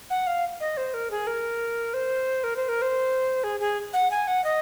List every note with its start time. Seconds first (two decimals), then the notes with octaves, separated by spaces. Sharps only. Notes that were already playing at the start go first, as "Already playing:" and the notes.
0.10 F#5
0.27 F5
0.60 D#5
0.77 C5
0.94 A#4
1.11 G#4
1.27 A#4
1.94 C5
2.44 A#4
2.56 C5
2.69 A#4
2.82 C5
3.44 G#4
3.60 G#4
3.93 F#5
4.11 G#5
4.27 F#5
4.44 D#5